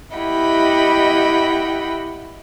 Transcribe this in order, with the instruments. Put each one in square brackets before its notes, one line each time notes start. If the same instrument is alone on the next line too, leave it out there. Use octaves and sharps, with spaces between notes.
[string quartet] E4 G4 D#5 F#5 G5 B5